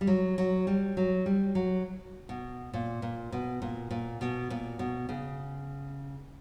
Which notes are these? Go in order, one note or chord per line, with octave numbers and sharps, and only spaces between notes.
G3
F#3
F#3
G3
F#3
G3
F#3
B2
A#2
A#2
B2
A#2
A#2
B2
A#2
B2
C#3